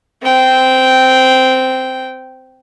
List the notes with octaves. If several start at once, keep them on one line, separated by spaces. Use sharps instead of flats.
C4 G5